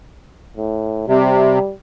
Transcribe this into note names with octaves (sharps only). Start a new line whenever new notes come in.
A2
C3 G3